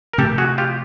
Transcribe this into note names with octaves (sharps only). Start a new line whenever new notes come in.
A#4
C3 F3 A3 C4 G4 A4
F#4 G#4
F4 G4